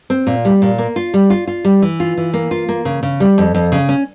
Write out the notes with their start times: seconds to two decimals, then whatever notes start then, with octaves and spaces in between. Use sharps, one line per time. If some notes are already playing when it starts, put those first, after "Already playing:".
0.10 C4
0.27 A#2
0.45 G3
0.62 A#2
0.78 A#3
0.96 F4
1.14 G3
1.30 F4
1.47 F4
1.65 G3
1.82 E3
2.00 F4
2.17 E3
2.34 A#3
2.51 F4
2.69 A#3
2.85 C#3
3.03 C#3
3.20 G3
3.38 F2
3.55 F2
3.72 C#3
3.89 C#4